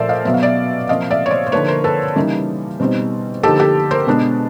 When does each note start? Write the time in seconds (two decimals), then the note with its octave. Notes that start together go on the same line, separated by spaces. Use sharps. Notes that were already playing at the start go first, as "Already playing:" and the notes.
Already playing: A#2 F3 A3 A4 A#4 C5 D5 E5
0.09 D#5 F5
0.25 B2 F#3 B3 E5
0.34 F5
0.43 D5 E5
0.89 C3 F3 A#3 D#5 F5
1.11 D5 E5
1.26 C#5
1.31 C5 D5
1.47 C5
1.52 D3 F3 A#3 D#4 B4 C#5
1.68 A#4 C5
1.84 A4 B4
2.16 C#3 E3 G3 A#3 D#4
2.80 B2 G3 C4 D#4
3.43 D3 F3 A#3 D#4 G4 A4
3.60 G4 A4
3.91 A#4 C5
4.07 B2 G#3 B3 D4